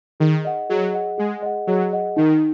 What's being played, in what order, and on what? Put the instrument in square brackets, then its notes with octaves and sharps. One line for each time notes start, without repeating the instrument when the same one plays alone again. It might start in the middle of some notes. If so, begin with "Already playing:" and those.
[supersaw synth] D#3 [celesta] G#4
[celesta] D#5 F#5
[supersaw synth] F#3 [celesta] G#4
[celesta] D#5 F#5
[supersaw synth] G#3 [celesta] G#4
[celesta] D#5 F#5
[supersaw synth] F#3 [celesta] G#4
[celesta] D#5 F#5
[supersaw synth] D#3 [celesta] D#4